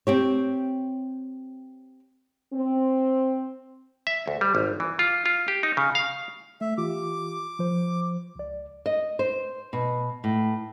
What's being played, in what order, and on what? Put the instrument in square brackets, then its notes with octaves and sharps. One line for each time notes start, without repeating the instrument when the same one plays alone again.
[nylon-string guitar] C4 G4 C#5
[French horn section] C4
[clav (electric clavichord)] E5
D2
G3
G#1
E3
F4
F4
G4
D#4
C#3
F5
[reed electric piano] A3 [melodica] E5
[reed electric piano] E3 F4 G4 [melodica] D6
[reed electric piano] F3 C5
C#2 D5
[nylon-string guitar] D#5
C5
B2
A2